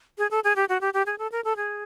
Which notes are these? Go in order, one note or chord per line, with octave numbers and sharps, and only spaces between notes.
G#4
A4
G#4
G4
F#4
G4
G4
G#4
A4
A#4
A4
G#4